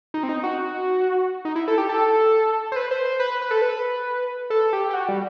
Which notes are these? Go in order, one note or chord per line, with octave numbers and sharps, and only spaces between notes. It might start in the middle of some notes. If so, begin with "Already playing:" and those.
D#4
C4
D#4
F#4
D#4
E4
A4
G4
A4
C5
B4
C5
C5
B4
B4
A4
B4
A4
G4
G4
F#4
G3